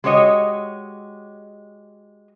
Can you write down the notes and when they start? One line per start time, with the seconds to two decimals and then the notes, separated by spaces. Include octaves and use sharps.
0.04 G#3 F#4 G4 C#5 D#5